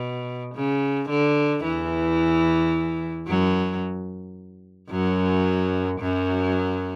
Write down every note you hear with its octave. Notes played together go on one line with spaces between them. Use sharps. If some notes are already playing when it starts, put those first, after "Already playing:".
Already playing: B2
C#3
D3
E2 E3
F#2 F#3
F#2 F#3
F#2 F#3